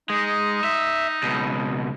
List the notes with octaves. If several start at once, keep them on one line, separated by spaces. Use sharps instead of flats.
G#3 D#4
E5
C#2 B2